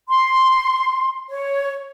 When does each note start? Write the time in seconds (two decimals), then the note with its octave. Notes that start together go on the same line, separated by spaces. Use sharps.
0.09 C6
1.29 C#5